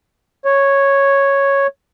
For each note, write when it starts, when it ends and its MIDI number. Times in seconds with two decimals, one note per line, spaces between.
0.45 1.67 73